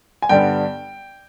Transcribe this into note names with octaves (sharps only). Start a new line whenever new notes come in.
G#5
G2 D3 G3 B3 G5